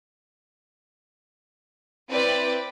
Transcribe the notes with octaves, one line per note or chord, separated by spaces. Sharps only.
C4 E4 B4 D5 G5